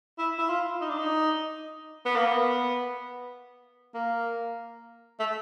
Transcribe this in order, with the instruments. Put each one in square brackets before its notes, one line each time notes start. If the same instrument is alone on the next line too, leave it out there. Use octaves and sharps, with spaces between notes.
[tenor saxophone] E4
E4
F4
D#4
D4
D#4
B3
A#3
B3
A#3
A3